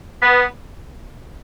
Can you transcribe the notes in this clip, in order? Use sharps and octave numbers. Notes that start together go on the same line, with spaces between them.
B3